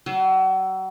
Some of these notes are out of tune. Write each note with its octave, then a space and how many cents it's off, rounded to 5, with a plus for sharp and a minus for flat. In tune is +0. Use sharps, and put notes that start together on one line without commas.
F#3 +35